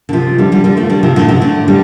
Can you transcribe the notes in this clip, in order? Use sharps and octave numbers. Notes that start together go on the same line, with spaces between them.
D3
C3 F3
D3 G3
D3 G3
D3 G3
F3 A3
D3 G3
C3 F3
A2 D3
C3
A2 D3
D3 G3